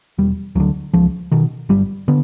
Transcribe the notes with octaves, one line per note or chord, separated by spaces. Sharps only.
E1 G3
D2 D3 F#3
C#2 F3
B2 D#3
G1 G3
D3 B3